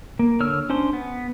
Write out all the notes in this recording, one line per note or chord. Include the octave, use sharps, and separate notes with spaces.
A#3
D3 C#5 E6 F6
C#4 D4 C5 C6
B3